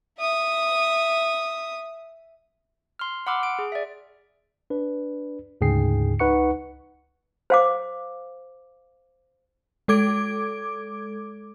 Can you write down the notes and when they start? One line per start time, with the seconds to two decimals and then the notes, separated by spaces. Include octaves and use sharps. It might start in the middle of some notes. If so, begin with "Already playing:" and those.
0.19 E5 D#6
2.99 C6 F6
3.27 F#5 B5 C6 D6 E6 F6
3.43 D7
3.59 G#4
3.72 D5 E5
4.70 D4 B4
5.61 D2 G#2 C#3 G#4 G5 C7
6.19 C#2 D#4 B4 F#5 C#6 C#7
7.50 C5 F5 D6
9.88 G#3 A4 D6 G#6 D7